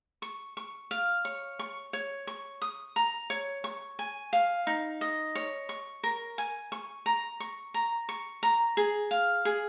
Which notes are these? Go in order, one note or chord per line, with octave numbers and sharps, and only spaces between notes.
C#6
C#6
F5
C#5
C#6
C#5
C#6
D#6
A#5
C#5
C#6
G#5
F5
D#4
D#5
C#5
C#6
A#4
G#5
C#6
A#5
C#6
A#5
C#6
A#5
G#4
F5
G#4